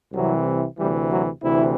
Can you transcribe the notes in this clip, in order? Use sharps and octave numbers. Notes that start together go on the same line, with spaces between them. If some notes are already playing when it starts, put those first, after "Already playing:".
C2 C3 E3 F#3
D2 C3 E3 G3
F#3
D2 C3 E3 E4